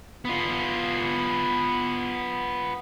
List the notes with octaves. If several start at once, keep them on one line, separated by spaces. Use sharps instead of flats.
B3 F4